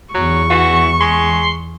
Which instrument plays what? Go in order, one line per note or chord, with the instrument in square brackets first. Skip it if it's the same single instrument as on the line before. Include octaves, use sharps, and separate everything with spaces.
[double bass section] E2 [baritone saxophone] F#3 [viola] C#6
[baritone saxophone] E3 [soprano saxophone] F#4
[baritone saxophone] G#3 [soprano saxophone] C6